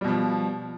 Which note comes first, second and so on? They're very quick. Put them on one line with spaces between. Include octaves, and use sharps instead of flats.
G3 B2 F3